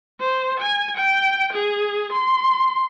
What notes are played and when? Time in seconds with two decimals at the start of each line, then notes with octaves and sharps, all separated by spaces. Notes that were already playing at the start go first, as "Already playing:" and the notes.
0.20 C5
0.59 G#5
0.96 G5
1.52 G#4
2.12 C6